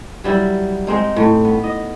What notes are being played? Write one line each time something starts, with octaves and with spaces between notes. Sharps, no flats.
F#3 G3 E4
G#3 C4 D#4
A2
B3
D#5